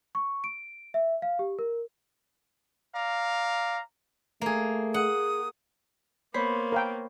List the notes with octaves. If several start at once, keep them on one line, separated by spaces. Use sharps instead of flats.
C#6
D7
E5
F5
G4
A#4
D5 F5 A#5
A3 A#3 G#4
G#4 F#5 D#6
A#3 B3 C5 C#5 B5
A#4 F5 G5